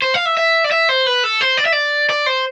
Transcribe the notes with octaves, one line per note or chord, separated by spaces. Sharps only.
C5
F5
E5
E5
D5
E5
C5
B4
A4
C5
D5
E5
D5
D5
C5